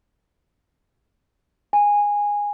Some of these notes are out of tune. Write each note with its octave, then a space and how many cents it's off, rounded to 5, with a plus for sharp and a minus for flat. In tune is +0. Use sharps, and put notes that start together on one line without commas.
G#5 -15